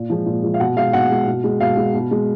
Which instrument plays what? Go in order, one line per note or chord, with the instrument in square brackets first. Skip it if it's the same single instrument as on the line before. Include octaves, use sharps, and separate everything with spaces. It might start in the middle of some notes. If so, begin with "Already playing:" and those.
Already playing: [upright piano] A#2
F3 G#3
A#2
F3 G#3
F5
B2 F#5
G#3 F5
B2 F#5
G#3
B2
G#3
B2 F5
G#3
B2
G#3